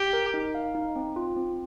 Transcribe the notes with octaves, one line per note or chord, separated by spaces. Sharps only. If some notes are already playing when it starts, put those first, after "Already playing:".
Already playing: G4
A#4
D#4
F5
D#4
C4
F4
C4